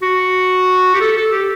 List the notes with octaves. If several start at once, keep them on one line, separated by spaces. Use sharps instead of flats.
F#4
G4
A4
A4
G4